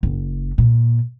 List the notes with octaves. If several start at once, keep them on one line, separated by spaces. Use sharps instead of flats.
F#1
A#2